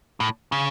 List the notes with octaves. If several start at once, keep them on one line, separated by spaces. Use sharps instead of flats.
A2
C#3